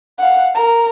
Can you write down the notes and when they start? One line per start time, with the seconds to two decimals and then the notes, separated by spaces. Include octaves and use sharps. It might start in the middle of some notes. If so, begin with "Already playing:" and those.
0.18 F5 F#5
0.55 A#4 A#5